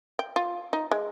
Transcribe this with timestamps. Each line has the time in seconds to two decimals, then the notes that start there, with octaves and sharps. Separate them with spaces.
0.19 G5
0.36 F4
0.73 D#4
0.91 G#3